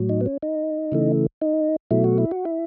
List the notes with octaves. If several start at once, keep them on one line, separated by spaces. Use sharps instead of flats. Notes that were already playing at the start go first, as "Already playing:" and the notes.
Already playing: A2 F#3
D#4
B3
C#4
D#4
C#3 E3 A3
D#4
B2 F#3 A3 E4
F#4
E4
F#4
E4